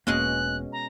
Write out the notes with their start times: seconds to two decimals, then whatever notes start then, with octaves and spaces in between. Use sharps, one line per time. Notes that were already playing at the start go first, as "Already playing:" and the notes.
0.07 E1 B2 G#3 A#3 C#4 F#6
0.72 A#5